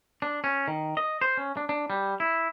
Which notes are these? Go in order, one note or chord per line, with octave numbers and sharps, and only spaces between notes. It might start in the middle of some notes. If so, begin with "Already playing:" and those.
D4
C#4
D#3
D#5
C5
C#4
D4
D4
G3
E4